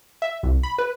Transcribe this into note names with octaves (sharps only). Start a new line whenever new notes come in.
E5
C2
B5
B4